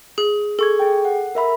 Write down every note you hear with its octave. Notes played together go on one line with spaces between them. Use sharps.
G#4
G#4 A4 C#6 G#6
G#4 G5
F#5
A#4 E5 B5